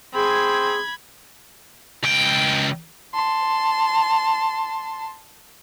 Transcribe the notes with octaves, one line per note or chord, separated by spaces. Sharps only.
C4 G#4 B5 G#6
C#2 G5
A5 C6